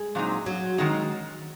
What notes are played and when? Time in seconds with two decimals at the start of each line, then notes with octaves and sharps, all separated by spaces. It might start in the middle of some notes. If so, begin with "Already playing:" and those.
Already playing: G#3
0.15 A#2 F#3 C4 D#4
0.46 F#3
0.78 D#3 F#3 G#3 C4 D#4